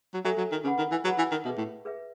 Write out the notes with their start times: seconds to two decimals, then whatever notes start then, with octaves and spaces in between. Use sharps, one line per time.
0.14 F#3
0.25 F#3 A4 E5 G#5
0.38 F#3
0.52 D#3
0.64 C#3 G#4 B4 F#5 B5
0.78 D#3
0.91 E3
1.04 F#3 G#4 B4 F#5 B5
1.18 E3
1.32 D#3
1.45 B2 G#4 B4 E5
1.58 A2
1.85 G#4 B4 E5